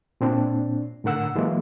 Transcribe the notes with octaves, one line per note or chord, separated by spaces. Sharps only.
A#2 C4 D4
A2 D3 A#4 F#5 E6
E3 F#3 G#3 A#3